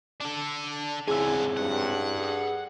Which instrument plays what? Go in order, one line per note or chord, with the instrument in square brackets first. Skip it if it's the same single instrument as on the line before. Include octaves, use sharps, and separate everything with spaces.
[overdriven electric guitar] D4 A4
[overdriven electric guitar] D3 G#5 [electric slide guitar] C4 C#4 E4 [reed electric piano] G#4 E6
[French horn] G2 [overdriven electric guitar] F#5
[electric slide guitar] G#4 A4